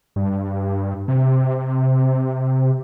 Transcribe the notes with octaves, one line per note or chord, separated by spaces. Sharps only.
G2
C3